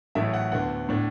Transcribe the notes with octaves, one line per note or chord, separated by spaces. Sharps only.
A1 A2 F#3 A3 E5
F#5
D2 D3 B3 F#5
A2 A3 D4